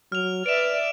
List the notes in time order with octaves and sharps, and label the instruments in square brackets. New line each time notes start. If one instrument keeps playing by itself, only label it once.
[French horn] F#3 [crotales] F6 F7
[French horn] B4 [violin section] D5 E5 [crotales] D7 E7